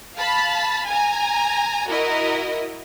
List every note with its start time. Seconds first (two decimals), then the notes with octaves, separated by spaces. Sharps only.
0.15 F5 A5 B5
0.88 G#5 A#5
1.89 E4 F#4 A#4 D#5